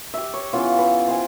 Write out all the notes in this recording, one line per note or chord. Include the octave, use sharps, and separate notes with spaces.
G4 E5
C#5
C#3 E3 B3 F4
B4
C5 G5 G#5